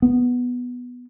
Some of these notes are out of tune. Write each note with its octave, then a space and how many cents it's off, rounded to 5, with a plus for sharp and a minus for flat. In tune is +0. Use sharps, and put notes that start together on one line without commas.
B3 +0